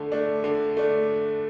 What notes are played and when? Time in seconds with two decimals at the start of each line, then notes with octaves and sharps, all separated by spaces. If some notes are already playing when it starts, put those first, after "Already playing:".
Already playing: D3 A3
0.12 A3 D4
0.44 D3
0.77 A3 D4